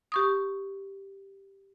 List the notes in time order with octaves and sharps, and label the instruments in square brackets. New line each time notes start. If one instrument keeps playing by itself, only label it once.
[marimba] G4 C#6 D#6